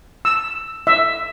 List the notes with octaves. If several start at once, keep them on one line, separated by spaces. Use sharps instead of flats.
E6
E5